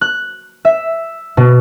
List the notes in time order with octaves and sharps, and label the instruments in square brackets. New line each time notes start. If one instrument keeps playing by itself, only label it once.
[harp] F#6
E5
B2